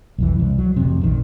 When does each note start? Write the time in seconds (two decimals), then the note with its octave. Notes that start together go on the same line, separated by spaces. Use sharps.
0.18 B1 F2 E3
0.39 C2
0.58 F#3
0.76 A1 F2 C3
1.01 A#1 D#3